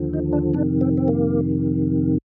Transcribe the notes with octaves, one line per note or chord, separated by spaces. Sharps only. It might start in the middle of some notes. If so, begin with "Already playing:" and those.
Already playing: D#2 D3 F3
D#4
D4
F2 C3 D#3 D4
C4
C4
A#3